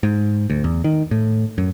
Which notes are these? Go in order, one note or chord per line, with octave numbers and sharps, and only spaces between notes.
G#2
D2
E2
D#3
A2
F#2